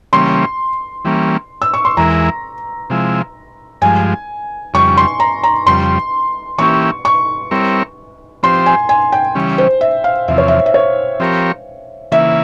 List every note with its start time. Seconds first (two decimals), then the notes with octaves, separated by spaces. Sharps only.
0.13 C#3 E3 G3 A#3 C#4 C6
1.05 E3 G3 A#3 C#4
1.62 E6
1.74 C#6
1.85 C6
1.97 E2 E3 G#3 E4 A#4 A#5
2.90 C3 F3 G#3 E4
3.82 G2 F3 G#3 G#5
4.74 F2 C#3 G3 C#6
4.97 C6
5.20 A#5
5.43 A#5
5.66 F2 C#3 G3 C6
6.58 E3 A#3 C#4 E4 G4 C#6
7.05 C#6
7.51 G3 C4 E4 A#4 C#5
8.43 F3 C4 G4 C5 C6
8.66 G#5
8.89 G#5
9.12 G5
9.35 C#3 E3 G3 C#4
9.58 C5
9.81 E5
10.04 F5
10.28 E2 C3 F3 E5
10.38 C#5
10.48 E5
10.66 E5
10.74 C#5
11.20 F3 C4 G4 A#4 C#5
12.12 C#3 E3 A#3 E4 E5